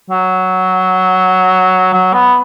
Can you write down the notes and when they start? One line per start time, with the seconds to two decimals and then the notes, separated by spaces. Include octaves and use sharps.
0.10 F#3
1.93 F#3
2.13 B3